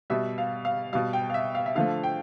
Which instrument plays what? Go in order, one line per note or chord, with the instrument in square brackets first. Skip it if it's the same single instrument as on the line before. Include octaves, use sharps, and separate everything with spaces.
[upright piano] B2 G3 E5
F5
F5
B2 G3 F5
G5
F5
E5
F5
E5
D3 F3 A3 F5
G5